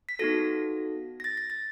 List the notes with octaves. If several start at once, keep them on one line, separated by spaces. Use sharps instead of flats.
B6
B3 D#4 F#4 A4 A#6
A#6
A6
A#6
A6